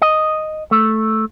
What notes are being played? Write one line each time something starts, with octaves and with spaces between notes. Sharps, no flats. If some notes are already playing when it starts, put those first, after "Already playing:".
D#5
A3